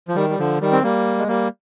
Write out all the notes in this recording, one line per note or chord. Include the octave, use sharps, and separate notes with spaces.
F3
D#3 G3
G3
D3 F3
D#3 G3
C4
G3 A#3
G#3
G3 A#3